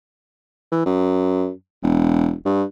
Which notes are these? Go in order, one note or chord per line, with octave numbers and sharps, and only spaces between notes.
E3
F#2
E1
G2